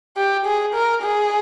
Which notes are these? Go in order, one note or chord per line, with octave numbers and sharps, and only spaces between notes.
G4
G#4
A#4
G#4